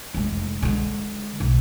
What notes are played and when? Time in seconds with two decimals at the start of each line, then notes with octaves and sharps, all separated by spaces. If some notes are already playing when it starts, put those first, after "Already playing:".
0.14 F1 G#3
0.62 D3 G#3
1.40 B1